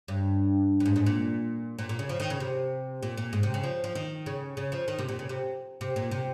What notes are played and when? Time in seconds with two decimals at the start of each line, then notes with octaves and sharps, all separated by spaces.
0.08 G2
0.80 G2
0.85 G#2
0.96 G#2
1.06 A#2
1.79 A#2
1.89 A#2
1.99 C#3
2.09 F3
2.20 D#3
2.30 C#3
2.40 C3
3.03 A#2
3.17 A#2
3.33 G#2
3.43 C3
3.54 C#3
3.64 F3
3.84 F3
3.95 D#3
4.26 C#3
4.57 C#3
4.72 F3
4.88 D#3
4.99 C3
5.09 A#2
5.19 C#3
5.29 C3
5.81 C3
5.96 A#2
6.11 C3